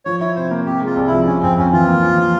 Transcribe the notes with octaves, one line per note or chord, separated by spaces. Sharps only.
F3 C#5
E4 C#5
C3 C5
A#3
C3 G4
G#3 F4
C2
E4
F3
C#3 C#4
F2 C4
F2 C#4
E3 F4
A#3
F3
F3